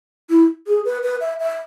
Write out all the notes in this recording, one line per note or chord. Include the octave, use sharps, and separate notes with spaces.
E4
G#4
B4
B4
E5
E5